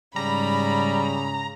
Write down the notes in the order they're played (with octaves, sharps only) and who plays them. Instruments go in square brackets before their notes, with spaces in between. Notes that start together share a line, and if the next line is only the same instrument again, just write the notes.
[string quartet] G#2 B5 [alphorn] C#3 [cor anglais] G3 [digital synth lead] A#5